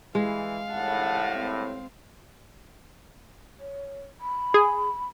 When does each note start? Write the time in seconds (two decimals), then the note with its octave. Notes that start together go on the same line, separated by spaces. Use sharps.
0.15 E3 G#3 F5
0.72 C2 A2 F#5 A5
1.39 C4
3.59 C#5
4.20 B5
4.54 G#4